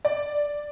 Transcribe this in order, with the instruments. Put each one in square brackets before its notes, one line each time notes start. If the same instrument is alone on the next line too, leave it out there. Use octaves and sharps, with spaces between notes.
[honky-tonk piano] D5